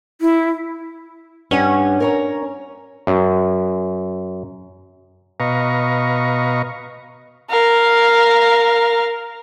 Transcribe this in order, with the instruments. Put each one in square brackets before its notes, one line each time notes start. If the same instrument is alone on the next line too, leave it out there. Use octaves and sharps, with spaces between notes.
[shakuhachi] E4
[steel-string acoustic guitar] G2 F#5 G#5 [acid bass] C#4
[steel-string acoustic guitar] A#4 C#5 A#5
[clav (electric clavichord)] F#2
[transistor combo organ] B2 B4 D#5 F5 A#5 C#6
[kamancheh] A#4 F5